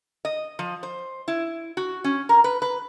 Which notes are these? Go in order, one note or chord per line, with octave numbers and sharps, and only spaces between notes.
D#5
F3
C5
E4
F#4
C#4
A#4
B4
B4